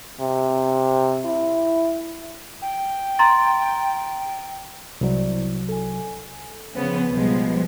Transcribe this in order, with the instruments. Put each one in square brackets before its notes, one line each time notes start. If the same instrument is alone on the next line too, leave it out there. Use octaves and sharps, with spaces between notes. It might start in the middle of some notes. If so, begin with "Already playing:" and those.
[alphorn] C3
E4
[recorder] G5
[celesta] A#5 C6 A6
[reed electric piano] C2 F#3 [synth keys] E4 C5 D5
[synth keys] A4 G#5
[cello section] C#3 B3 [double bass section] F3 C4
[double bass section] B1 B3 [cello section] F3 G3 G#3